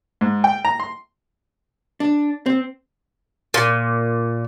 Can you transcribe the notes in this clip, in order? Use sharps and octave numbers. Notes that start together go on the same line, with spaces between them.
G#2
G5
A#5
C6
D4
C4
A#2